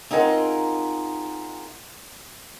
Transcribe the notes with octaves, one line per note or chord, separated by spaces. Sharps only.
C4 D#4 F4 G#4 A#4 F#5